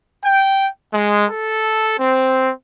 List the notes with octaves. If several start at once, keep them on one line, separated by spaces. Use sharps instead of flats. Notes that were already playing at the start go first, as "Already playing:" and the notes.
G5
G#3
A4
C4